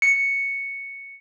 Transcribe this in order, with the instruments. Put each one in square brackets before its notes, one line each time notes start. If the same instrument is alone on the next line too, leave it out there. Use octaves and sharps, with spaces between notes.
[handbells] C#7